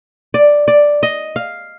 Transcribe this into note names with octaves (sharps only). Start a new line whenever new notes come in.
D5
D5
D#5
F5